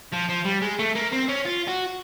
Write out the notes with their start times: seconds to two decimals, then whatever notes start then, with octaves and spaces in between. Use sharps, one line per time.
0.12 F3
0.29 F3
0.45 G3
0.62 G#3
0.79 A3
0.95 A#3
1.13 C4
1.29 C#4
1.46 F4
1.68 F#4